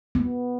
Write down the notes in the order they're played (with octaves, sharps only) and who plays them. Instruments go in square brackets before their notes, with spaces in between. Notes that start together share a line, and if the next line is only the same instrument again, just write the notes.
[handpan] B3